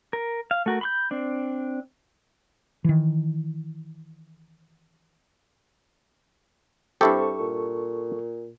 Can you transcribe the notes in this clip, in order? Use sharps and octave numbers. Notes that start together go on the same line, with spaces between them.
A#4
F5
A3 F#4 A#4
B5 C6 G6
C4 D4
D#3 E3
G2 C4 E4 G4 A4 C#6
A#2